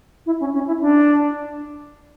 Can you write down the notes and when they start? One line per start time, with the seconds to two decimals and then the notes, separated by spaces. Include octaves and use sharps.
0.26 E4
0.40 C#4
0.54 C#4
0.67 E4
0.81 D4